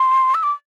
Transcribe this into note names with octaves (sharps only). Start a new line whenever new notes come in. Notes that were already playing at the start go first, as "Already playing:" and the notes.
Already playing: C6
E6
D6